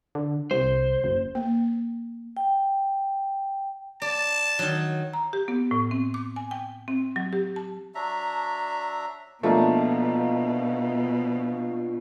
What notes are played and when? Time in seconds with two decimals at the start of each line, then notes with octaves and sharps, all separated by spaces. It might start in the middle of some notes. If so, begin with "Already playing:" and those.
0.15 D3
0.51 C2 C5
1.04 F#1
1.35 A#3
2.37 G5
4.02 D5 A5
4.59 D#3 F#3
5.13 A#5
5.33 G4
5.48 B3
5.71 A2
5.91 C4
6.14 D6
6.36 G#5
6.51 G5
6.88 C4
7.16 F#3
7.33 G4
7.56 A5
7.95 F#3 D4 E5 A#5
9.43 B2 F3 A3 A#3 D4 D#4